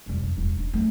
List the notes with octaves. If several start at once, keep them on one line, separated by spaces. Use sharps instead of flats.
E1 G3
F2
E1 E4
D4
A3 D4